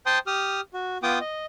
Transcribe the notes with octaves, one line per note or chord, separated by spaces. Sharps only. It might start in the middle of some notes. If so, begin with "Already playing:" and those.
C5 G5 A5 C6 D#6
G4 D#6 F6
F#4
B3 F4 G5 D6 D#6
D#5